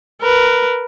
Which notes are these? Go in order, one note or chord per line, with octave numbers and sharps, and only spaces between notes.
A#4 B4